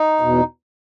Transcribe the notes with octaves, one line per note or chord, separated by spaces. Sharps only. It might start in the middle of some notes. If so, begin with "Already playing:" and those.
Already playing: D#4
E2 B2